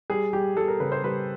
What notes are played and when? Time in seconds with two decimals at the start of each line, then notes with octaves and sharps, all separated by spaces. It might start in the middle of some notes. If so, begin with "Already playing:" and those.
0.10 G3 G#4
0.33 G3 G4
0.56 G3 A4
0.68 A#4
0.80 C#3 B4
0.92 C5
1.03 G3 B4